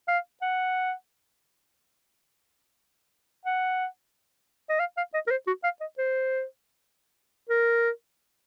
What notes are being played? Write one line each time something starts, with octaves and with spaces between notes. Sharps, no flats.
F5
F#5
F#5
D#5
F5
F5
D#5
A#4
C5
F#4
F5
D#5
C5
A#4